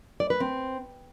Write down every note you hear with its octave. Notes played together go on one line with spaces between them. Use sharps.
D5
B4
C4